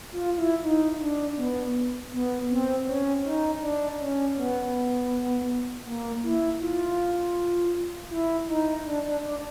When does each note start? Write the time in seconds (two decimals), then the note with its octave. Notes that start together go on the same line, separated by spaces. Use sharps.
0.12 F4
0.37 E4
0.63 D#4
1.00 D4
1.37 B3
2.12 B3
2.50 C4
2.87 C#4
3.25 D#4
3.61 D4
4.00 C#4
4.37 B3
5.86 A#3
6.24 E4
6.60 F4
8.10 E4
8.48 D#4
8.86 D4
9.04 D4
9.22 D4